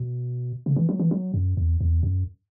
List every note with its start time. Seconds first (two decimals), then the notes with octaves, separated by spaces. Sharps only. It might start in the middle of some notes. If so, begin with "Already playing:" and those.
Already playing: B2
0.66 C#3
0.76 E3
0.89 F#3
1.00 E3
1.11 F#3
1.34 F#2
1.57 E2
1.81 E2
2.03 F#2